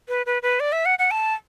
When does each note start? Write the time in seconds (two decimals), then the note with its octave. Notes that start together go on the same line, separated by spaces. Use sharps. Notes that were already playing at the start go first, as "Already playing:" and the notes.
0.08 B4
0.26 B4
0.43 B4
0.60 D5
0.72 E5
0.86 F#5
0.99 F#5
1.11 A5